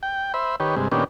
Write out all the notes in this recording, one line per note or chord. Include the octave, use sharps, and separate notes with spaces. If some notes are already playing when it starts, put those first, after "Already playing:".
G5
C5 E5 B5
D#3 G4 B4 C#5
G2 C3 G#3
A#2 D#3 B3 C#4 D4 G4